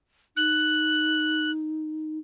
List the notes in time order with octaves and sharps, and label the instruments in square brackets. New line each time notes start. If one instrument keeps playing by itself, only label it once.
[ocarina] D#4 [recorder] F#6